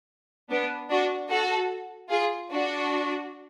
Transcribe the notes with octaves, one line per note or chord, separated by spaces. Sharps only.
B3 D4
D4 F#4
F#4 A4
F4 G#4
D4 F#4